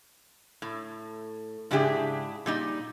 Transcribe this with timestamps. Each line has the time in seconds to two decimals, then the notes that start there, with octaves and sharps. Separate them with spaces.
0.62 A2
1.71 G#2 C#3 D4 E4 G4 G#4
2.46 A#2 G3 D#4